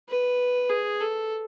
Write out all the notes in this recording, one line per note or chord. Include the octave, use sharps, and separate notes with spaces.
B4
G#4
A4